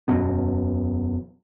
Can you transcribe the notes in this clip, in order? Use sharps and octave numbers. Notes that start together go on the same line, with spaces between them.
E1 F#2 B2 B3